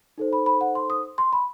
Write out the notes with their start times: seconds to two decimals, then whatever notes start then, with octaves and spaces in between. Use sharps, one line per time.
0.18 D#4 A4 C5
0.33 B5
0.46 B5
0.61 F#5
0.75 C6
0.90 D#6
1.18 C6
1.33 B5